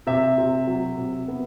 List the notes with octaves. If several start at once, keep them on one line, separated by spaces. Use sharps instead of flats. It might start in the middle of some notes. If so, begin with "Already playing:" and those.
C3 E5
C3
F#3
C3
B3